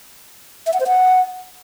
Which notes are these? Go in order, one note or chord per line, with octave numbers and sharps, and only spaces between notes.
E5
F#5
C5
F#5